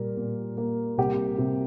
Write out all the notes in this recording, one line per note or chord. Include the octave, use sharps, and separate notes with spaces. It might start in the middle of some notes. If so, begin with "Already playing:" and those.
Already playing: A#2 G3 A#4
A#2
A#3
C2 G4
C3